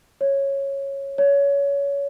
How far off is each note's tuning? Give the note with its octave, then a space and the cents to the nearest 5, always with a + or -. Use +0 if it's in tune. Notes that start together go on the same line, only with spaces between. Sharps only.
C#5 -10
C#5 +20